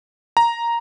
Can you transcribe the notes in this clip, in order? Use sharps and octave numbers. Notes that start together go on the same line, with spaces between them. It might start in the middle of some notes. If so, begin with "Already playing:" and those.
A#5